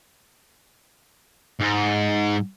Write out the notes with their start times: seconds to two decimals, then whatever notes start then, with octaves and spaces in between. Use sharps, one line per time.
1.60 G#2